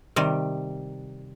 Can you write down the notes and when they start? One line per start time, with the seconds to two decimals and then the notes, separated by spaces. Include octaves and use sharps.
0.16 C3 D#3 G3